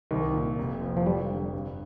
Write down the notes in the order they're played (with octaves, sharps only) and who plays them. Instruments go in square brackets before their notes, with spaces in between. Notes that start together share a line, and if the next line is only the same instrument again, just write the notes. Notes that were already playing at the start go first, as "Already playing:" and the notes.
[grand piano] C2 [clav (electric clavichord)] D#3
[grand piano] A#2
F1
F2
[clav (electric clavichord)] F3
[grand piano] F2 [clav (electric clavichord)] G3
[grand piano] D3
G2